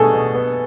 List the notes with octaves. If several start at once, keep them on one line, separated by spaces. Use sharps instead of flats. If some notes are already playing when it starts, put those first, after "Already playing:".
Already playing: B2 A3 D4 G#4 A4
B2
B3